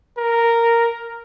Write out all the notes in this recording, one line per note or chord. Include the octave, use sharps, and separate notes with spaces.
A#4